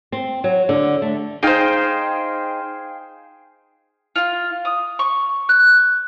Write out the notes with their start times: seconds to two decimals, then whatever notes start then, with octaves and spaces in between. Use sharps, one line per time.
0.12 C4
0.44 F#3
0.69 D3
1.02 A3
1.43 D#4 G#4 C5 F5 G5
4.16 F4
4.65 D#6
4.99 C#6
5.49 F#6